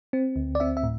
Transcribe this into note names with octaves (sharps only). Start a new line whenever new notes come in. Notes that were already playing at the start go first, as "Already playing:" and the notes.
C4
D2
D5
C4 E5
E5
A2